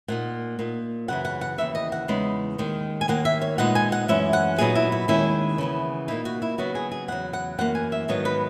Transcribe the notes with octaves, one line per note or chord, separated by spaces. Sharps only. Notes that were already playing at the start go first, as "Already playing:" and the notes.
A#2 A#3 D#4 F#5
A#2 A#3 D#4
F#2 C#3 E3 F#5
F#5
F#5
D#2 C#3 E3 E5
D#5
F#5
E2 C#3 G#3 B3 D#4
D#2 D#3 G#3
G#5
D#2 D#3 A#3 F#5
E5
C#5
A#2 G#3 B3 D#4 F#5
G#5
F#5
F#2 E3 G#3 C#4 E5
F#5
A#2 F#3 B3 D#4 G#4
E4
E4
D#2 D#3 G#3 C#4 E4
C#3 E3 B3
A#2 A#3 D#4 E4
F#4
E4
C#3 F#3 B3 D#4 F#4
G#4
G#4
E2 C#3 F#3 F#5
F#5
F#2 E3 A#3 F#5
G#5
E5
G#2 D#3 F#3 B3 D#4 C#5
B4